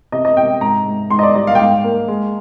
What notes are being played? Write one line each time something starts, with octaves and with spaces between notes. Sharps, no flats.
C3 D#5
D#5
C3 G5
G#2 A#5
G#2
G#2 C6
D#5
D5
G3 D#5
F5
G5
G#2 F5
A#3
G#3